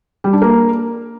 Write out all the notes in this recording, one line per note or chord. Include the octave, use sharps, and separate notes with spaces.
G3
D4
A#3